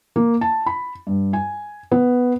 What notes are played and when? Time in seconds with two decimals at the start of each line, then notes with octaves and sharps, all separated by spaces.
0.16 A#3
0.41 A5
0.66 B5
1.07 G2
1.33 G#5
1.91 B3